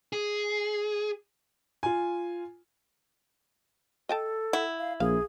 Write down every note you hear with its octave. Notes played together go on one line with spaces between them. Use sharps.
G#4
F4 G#5
A4 D#5 G5 A5
E4 F#5
F5
A#1 G#4 F5